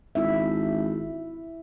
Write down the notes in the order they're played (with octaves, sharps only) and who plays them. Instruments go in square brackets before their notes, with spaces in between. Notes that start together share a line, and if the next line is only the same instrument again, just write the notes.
[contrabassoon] G#1 [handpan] E4 E5